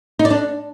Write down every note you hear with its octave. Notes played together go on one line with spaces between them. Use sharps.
D#4
D5
D4